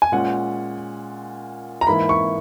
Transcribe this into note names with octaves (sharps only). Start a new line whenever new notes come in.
G#5
A#2 G#3 C#4 F#5
A#5
G#2 E3 A#3 E4 B5
C#6